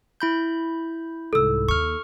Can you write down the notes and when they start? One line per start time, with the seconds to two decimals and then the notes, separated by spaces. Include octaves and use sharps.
0.20 E4 B5 G6
1.33 C2 G#2 A4 E6
1.69 D#2 A#3 C#6 F6